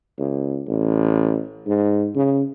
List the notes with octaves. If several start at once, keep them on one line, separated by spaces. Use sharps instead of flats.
C#2
A1
G#2
C#3